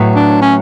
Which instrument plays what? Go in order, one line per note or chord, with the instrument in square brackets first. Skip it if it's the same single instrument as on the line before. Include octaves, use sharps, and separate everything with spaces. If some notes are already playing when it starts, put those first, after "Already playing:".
Already playing: [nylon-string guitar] A2 F#3 B3
[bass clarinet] D4
C#4